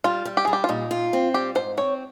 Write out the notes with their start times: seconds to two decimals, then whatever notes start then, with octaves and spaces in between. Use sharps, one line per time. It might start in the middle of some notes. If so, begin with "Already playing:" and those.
0.04 G3 F4
0.25 G3
0.37 G4
0.45 G3 G#4
0.53 G4
0.64 F4
0.69 A#2 D#4
0.91 F4
1.13 C4
1.34 G3 G4
1.55 G#2 C5
1.77 C4 C#5